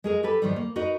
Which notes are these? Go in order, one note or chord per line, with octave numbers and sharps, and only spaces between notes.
G#3 G#4 A#4
G4 A4 B4
G#2 D#3 F3 G3
A#3
D#4 F#4 A#4 B4 D#5